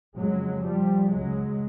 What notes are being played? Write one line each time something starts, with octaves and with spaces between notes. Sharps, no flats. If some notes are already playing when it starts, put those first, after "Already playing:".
F2 C#3 F#3 G#3
F3 G3
C#2 C#3 F#3 G#3